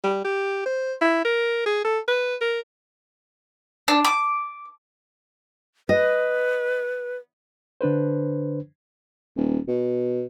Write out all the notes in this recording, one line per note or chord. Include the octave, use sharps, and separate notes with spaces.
G3
G4
C5
E4
A#4
G#4
A4
B4
A#4
D4
D6
B4 D#5
D3 D4 B4 C5
D#1
B2